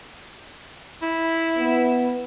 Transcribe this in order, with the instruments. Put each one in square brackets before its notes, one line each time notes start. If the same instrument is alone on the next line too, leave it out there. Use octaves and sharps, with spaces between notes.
[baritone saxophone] E4
[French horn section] B3